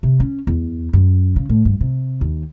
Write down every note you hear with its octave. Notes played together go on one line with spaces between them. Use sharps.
C3
C#4
E2
F#2
C#3
A2
G2
C3
D#2